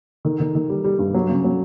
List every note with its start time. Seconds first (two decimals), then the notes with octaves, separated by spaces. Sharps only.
0.25 D#3
0.40 D#3
0.55 D#3
0.70 G3
0.84 G3
0.99 G2
1.14 F#3
1.29 C#3
1.44 F#3